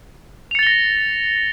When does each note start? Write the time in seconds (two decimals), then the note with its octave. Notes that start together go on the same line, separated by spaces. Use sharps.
0.51 F7
0.55 C#7
0.59 A6
0.63 G7
0.67 A#6